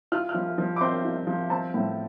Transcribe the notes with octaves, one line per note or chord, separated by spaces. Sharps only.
F4 F6
F6
F3
F3
D6
C4 C6
F4
F3
C4 A5
A2